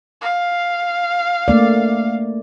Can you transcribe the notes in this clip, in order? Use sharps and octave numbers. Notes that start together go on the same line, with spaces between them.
F5
A3 A#3 D5